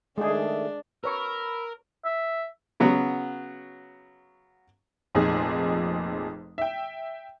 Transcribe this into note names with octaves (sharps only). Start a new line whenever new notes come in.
D#3 G#3 A3 D4 G#4
A#4 B4 C#5 B5 C#6 E6
E5
C#3 F#3 B3 F#4
F1 F2 A#2 D#4 G#4
E5 G5